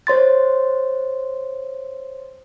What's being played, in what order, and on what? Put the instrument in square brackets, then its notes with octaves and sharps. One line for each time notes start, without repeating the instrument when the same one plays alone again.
[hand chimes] C5 C#5 C6 A6